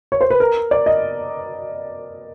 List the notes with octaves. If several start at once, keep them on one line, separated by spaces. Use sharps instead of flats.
C#5
C5
B4
A#4
D5
D#5